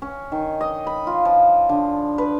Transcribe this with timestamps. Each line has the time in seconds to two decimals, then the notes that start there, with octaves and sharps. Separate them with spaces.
0.02 C#4
0.32 D#3
0.61 D#5
0.87 B5
1.07 F4
1.25 F3
1.69 D3
2.18 B4